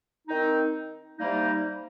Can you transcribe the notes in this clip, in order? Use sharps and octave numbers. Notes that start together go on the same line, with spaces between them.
D#3 C4 D#4
C3 G3 A#3 D#4